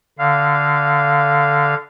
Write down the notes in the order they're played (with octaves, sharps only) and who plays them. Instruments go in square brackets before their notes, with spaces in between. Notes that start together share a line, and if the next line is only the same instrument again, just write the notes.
[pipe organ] D3 F5